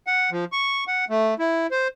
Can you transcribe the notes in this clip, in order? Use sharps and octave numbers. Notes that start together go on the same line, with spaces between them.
F#5
F3
C#6
F#5
A3
E4
C5